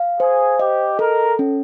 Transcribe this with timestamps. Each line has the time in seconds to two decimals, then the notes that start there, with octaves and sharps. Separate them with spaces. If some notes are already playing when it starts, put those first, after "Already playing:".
Already playing: F5
0.20 G#4 C5
0.59 G4 D#5
0.99 A4 A#4
1.39 C#4